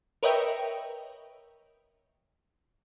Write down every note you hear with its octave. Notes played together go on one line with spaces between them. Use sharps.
A#4 B4 C#5 D#5 E5 G5